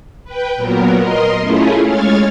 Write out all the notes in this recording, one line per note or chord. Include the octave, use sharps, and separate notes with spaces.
B4 G5
A#2 F#3 B3 A#4
A#4 D#5 C6
A3 C#4 E4 F4 G#4
G#3 C#5 F6 G#6 A6